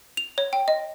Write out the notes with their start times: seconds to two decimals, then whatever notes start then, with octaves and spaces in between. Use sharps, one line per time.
0.17 F7
0.38 C#5
0.53 G5
0.68 D#5